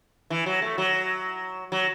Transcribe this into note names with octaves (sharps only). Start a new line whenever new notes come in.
E3
F#3
A3
F#3
F#3